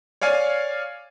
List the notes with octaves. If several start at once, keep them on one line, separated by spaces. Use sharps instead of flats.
C#5 D5 F5 G#5